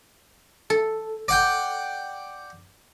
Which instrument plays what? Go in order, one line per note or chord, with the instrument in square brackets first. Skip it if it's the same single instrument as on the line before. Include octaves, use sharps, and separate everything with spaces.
[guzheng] A4
[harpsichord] D5 F#5 G5